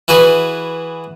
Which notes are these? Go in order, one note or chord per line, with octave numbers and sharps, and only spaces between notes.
E3 F#4 G#4 B4